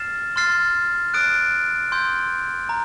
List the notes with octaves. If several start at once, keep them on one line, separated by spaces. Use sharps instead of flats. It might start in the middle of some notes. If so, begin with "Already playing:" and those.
Already playing: F6 A6 C7 E7
C6 F6 A6 C7
D#6 F#6 A6 D7
C6 D#6 G6
A#5